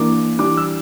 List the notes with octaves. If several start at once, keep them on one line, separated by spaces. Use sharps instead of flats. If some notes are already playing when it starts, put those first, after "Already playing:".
Already playing: E3 A#3 D4 D6
E3 G3 D4 D6
E6